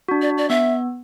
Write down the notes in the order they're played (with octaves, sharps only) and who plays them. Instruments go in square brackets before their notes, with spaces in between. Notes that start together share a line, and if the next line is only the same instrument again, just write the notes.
[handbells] D4 F#4
[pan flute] D5
D5
[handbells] B3 [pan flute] E5